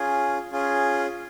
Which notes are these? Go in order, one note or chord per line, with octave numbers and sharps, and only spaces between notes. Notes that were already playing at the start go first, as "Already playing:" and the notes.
Already playing: C#4 F4 G#4
C#4 F4 G#4